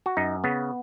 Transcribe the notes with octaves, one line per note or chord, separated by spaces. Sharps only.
F#4
F#2 D#4
C#3 B3